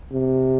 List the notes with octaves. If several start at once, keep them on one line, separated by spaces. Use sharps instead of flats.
C3